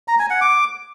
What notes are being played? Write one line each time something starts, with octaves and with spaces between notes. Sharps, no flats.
A#5
G#5
F#5
D6